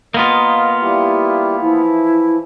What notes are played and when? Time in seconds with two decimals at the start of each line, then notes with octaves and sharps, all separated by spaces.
0.14 A#3 B3 F4 A#4 D#5
0.82 G3 E4 G4
1.60 E3 F3 E4